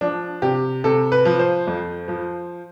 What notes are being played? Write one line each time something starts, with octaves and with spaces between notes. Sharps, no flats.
F3 D4
C3 G4
C3 A4
B4
F3
C5
F2
F3